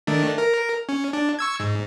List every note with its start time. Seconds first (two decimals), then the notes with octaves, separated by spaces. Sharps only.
0.07 D#3 A3 D4
0.38 A#4
0.89 C#4
1.13 D4
1.39 C#6 E6 G#6
1.60 G#2